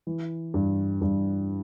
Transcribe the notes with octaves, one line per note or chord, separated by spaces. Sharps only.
E3
G2
G2